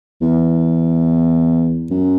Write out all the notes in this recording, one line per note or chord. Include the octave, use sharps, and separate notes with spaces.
E2
F#2